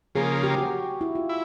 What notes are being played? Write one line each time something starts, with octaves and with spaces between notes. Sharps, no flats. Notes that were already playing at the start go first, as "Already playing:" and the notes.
C#3 F3 A#3 G#4
G4
F#4
E4
F4
E4